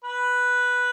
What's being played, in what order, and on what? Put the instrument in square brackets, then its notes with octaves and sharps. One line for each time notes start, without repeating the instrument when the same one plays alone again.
[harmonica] B4